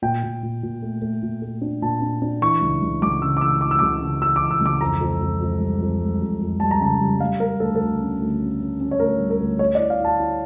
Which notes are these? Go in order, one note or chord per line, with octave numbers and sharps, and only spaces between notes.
A#2 G5
A#2
A#2
A#2
A3
A3
A#2
A3
D4
A#2 A5
D4
D4
E3 C#6
C#2
C#2
C#2 D6
C#3 E6
D6
E3 E6
E3 D6
E6
C#2 D6
C#3
E3 E6
D6
E3
E6
C#2 D6
F2 A#5
F2
F2
F2
G3
F2
G3
F2
F2
G3 A5
A#5
C#3 A5
G3
G3 F5
G3 A#4
D2 A4
A4
D2
C#4
D2
C#4
C#4
C#4
C#5
D2 A#4
G3
A#4
D2
A3 C#5
D5
E4
F5
E4 A5
E4